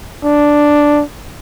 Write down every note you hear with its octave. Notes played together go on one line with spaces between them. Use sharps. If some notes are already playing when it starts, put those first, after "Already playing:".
D4